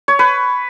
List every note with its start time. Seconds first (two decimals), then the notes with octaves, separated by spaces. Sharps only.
0.08 C#5
0.19 B4